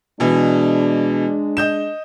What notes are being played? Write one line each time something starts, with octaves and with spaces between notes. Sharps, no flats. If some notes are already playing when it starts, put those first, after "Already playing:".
B2 E3 G#3 D4
D#5 G6 E7